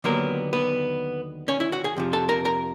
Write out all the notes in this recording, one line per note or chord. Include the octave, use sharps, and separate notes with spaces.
D#2 D3 F#3 A#3 B3 A#4
B3 B4
C#4 C#5
E4 E5
F#4 F#5
G#4 G#5
F2 C3 F3
A4 A5
A#4 A#5
A#4 A#5